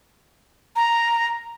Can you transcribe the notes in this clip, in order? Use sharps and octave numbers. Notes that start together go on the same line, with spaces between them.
A#5